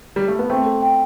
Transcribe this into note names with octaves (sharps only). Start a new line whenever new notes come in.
G3
A3
B3
A3 C4 G5
A4
G5